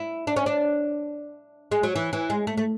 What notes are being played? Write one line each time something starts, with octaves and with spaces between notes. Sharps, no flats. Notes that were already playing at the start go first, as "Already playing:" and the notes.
Already playing: E4
D4
C#4
D4
G#3
F#3
E3
E3
G#3
A3
A3